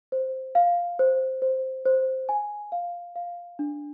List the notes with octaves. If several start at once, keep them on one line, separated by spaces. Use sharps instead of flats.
C5
F5
C5
C5
C5
G#5
F5
F5
D4